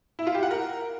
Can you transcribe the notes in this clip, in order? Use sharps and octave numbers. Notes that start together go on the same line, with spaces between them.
E4
F4
G4
F#5
A#4